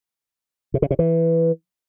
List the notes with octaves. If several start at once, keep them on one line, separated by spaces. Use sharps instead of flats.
C3
C#3
C3
E3